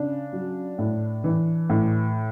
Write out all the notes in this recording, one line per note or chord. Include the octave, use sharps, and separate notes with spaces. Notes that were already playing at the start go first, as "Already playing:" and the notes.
Already playing: C#3 D4
F#3
A2
E3
A2